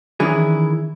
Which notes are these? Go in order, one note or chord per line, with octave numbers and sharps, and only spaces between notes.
D#3 E3 C#4 D4 E4 G#4